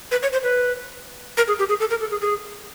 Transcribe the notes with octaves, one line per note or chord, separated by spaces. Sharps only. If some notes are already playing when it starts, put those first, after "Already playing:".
B4
C#5
C5
B4
A#4
G#4
G4
G#4
A4
A#4
A4
G#4
G#4